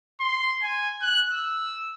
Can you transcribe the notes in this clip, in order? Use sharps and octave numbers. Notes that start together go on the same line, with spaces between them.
C6
G#5
F#6
E6